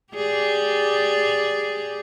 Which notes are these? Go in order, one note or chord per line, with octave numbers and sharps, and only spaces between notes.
G4 G#4 D5